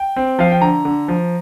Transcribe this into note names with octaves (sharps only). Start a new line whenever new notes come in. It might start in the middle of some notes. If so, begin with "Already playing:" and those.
Already playing: G5
C4
F3 F5
G5
D3 A#5
D3
F3